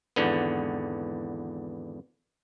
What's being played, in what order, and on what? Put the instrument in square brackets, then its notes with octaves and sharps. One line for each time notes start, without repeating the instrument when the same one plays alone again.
[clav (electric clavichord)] G#1 E2 D3 B3